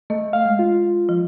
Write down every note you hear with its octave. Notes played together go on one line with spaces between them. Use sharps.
A3 D#5
F5
G#3
F4
F3